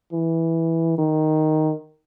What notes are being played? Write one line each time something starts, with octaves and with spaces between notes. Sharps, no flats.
E3
D#3